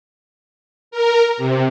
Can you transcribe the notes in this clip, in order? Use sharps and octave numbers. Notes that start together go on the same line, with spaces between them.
A#4
C3